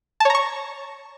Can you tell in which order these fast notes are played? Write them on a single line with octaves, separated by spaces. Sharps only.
A5 C#5 A#5 C#6